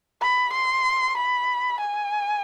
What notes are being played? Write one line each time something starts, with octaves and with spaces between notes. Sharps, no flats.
B5
C6
B5
G#5